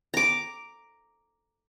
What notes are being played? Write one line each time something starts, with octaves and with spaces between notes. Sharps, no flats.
A#5 D6